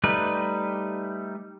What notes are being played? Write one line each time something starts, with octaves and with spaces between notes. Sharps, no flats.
G3 A3 D#4 B4